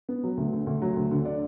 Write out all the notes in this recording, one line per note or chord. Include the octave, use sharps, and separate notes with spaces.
B3
F#3
D2
D3
D2
F#3
D2
D3
D5